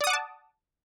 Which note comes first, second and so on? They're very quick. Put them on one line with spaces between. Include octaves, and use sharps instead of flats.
D5 D#6 F#5 D6 A5